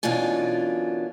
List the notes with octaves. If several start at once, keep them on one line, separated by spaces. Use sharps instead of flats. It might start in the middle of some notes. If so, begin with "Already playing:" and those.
F#2 B2 E3 D4 F4 G#5